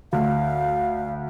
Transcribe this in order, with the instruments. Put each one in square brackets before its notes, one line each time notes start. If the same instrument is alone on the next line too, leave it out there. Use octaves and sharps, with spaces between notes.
[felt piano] D2 [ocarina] F5